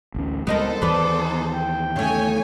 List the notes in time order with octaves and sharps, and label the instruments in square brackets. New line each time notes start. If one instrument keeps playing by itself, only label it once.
[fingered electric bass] A1 D2 C#4
[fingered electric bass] C#2 G3 G#3 [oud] B3 D#4 A#4 [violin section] A4 C5
[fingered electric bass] D#2 E3 [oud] B3 B4 [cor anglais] D5
[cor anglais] D#4
G5
[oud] C#3 A3 [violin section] C#5 G#5